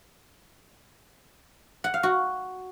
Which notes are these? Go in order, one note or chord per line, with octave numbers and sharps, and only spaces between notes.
F#5
F5
F#4